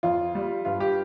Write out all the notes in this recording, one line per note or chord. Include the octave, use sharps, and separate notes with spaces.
F2 F4
G3
G2 F4
G4